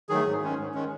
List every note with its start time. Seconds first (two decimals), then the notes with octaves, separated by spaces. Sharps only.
0.09 D#3 F#3 A3 G#4
0.26 G#2
0.42 D#3 G#3 C#4
0.58 G#2
0.74 D#3 G#3 C#4